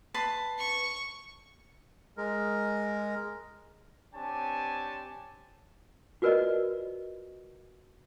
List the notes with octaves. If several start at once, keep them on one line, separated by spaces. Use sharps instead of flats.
B4 A5 C6
C#6
G#3 A#4
C4 D4 G4 C#5 G#5 A5
F4 F#4 A#4 B4 D5 D#5